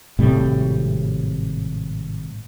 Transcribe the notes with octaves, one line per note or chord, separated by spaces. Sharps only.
G#1 A2 C3 G3